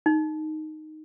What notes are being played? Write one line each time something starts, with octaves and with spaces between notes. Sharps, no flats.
D#4